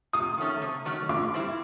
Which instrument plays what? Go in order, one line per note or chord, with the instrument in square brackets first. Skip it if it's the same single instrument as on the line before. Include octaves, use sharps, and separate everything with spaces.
[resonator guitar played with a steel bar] C3 [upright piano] D#6
[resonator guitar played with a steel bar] D#3 F#3 A3 C#4
C3
D#3 F#3 A3 C#4
[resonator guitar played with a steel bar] D3 [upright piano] D6
[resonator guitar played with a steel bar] G3 C4 E4